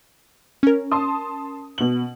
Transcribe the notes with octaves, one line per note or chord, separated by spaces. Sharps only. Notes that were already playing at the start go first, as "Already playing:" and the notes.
C#4 A#4
A5 C6 D#6
B2 F#7